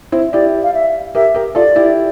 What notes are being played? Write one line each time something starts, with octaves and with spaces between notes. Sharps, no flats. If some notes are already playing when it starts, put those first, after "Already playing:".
C4 E4
E4 G4 D5
F5
E5
G4 A#4 E5
G4 A#4
F4 A4 D5
E4 G4